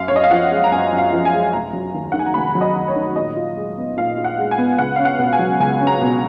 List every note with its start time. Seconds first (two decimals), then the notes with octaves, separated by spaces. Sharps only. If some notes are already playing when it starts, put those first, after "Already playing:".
Already playing: F#2 F5
0.08 C#5
0.11 F#2 D#5
0.24 F5
0.31 F3 F#5
0.51 G#3
0.64 A#5
0.72 F#2 G#5
0.92 F#2
0.98 F5
1.13 F3
1.25 G#5
1.33 G#3
1.53 F1 A#5
1.73 F#3
1.94 D#2
2.12 D#3 F#5
2.19 G#5
2.26 A#5
2.34 F1 B5
2.55 F#3
2.61 D#5
2.76 D#2
2.88 C#5
2.96 D#3
3.16 A#2 D#5
3.36 F4
3.57 G#3
3.77 B3
3.97 A#2 F5
4.17 F4
4.24 F#5
4.38 G#3
4.51 G#5
4.58 B3
4.78 C#2 F#5
4.96 C#4 F5
5.05 F#5
5.19 B2
5.33 G#5
5.39 F#3
5.60 C#2 G#5
5.80 C#4
5.87 A#5
6.01 B2